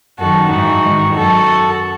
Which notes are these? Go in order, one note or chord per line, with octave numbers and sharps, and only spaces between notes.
F#2 D#3 F#4 A4
G#2 E3 D#4 F#4
G#2 D#3
F#2 F#4 A4